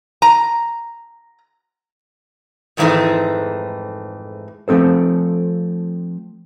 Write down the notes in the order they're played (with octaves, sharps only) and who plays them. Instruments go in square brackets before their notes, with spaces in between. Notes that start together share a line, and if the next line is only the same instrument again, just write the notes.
[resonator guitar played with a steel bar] A#5
F2 G#2 D#3 E3 G#3 A3
[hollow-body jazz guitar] F3 A3 C4 A4 C5